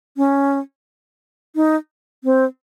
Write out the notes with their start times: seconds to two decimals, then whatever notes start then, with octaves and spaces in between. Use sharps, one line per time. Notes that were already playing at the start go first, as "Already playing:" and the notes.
0.17 C#4
1.55 D#4
2.24 C4